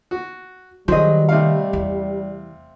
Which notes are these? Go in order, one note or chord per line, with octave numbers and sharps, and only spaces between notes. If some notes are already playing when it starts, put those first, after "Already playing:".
F#4
D#3 F#3 G3 G#4 C5 D#5
C3 A3 F5
E2